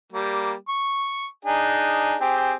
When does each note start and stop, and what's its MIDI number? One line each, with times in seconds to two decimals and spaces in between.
0.13 0.53 55
0.13 0.53 58
0.69 1.27 85
1.45 2.15 62
1.45 2.15 63
1.45 2.15 68
2.21 2.53 60
2.21 2.53 67
2.21 2.53 68